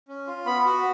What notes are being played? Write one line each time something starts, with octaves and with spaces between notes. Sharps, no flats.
C#4
F4
B3 B5
F#4